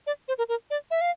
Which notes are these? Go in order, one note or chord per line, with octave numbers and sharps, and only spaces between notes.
D5
C5
A#4
A#4
D5
E5
F5